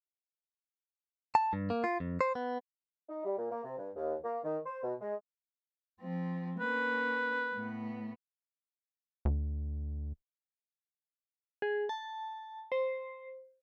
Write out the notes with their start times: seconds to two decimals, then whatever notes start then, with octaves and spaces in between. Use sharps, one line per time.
1.35 A5
1.53 G2
1.70 A#3
1.84 F4
2.00 F2
2.21 C5
2.35 B3
3.09 D#4
3.25 G3
3.38 A#2
3.51 A#3
3.64 C3
3.78 G2
3.96 D#2
4.23 A#3
4.44 D#3
4.65 C5
4.83 B2
5.01 G#3
6.01 F3 C4
6.60 A#3 C#4 B4
7.54 A2 B3
9.25 D2
11.62 G#4
11.89 A5
12.72 C5